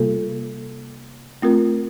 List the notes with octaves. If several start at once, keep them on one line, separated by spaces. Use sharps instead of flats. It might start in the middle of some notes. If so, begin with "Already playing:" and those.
Already playing: C3 G3 A#3 F4 A4
A3 C4 F4 A#4